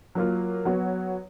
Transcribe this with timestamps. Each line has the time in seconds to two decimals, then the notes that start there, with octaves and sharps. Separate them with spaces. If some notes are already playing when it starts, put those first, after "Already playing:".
0.15 F#3 A#3 F4
0.65 F#3 B3 F#4 C#5